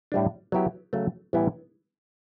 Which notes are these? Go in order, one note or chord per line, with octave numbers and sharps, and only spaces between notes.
A2 G3 D4
F#3 B3 E4 G4
C#3 F#3 A3
A2 E3 G3 B3 E4